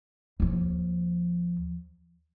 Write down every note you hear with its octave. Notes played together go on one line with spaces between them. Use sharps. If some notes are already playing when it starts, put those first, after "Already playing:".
D#2 F3